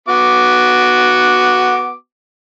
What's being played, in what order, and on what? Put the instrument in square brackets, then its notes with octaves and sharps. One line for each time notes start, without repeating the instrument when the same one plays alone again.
[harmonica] B3 F#4 D6